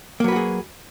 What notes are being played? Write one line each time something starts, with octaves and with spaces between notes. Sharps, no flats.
F#3 A#3 F#4 G#4 B4